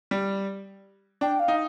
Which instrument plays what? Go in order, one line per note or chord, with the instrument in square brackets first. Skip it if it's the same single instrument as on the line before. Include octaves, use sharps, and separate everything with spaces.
[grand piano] G3
[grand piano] D4 [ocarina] G5
[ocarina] F5
[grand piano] D#4